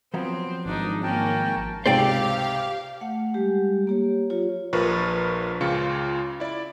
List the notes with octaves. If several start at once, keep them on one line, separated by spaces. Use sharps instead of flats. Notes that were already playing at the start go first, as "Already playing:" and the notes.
F3 F#3 B3 C4
G#1 D4 D#4
A#3 C#4 A#4 G5 A5
C#2 G#2 C3 G4 C5 D5 F5 G5
A3 F#5
G3 G#3 G4
A#3 G4 C#5
F#3 F4 G4 C#5
A#1 F3 A#4 B4 C#6
C#2 C#3 F4 C#7
E4 D5